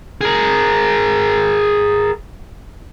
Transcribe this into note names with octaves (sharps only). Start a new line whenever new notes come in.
G#4 A#4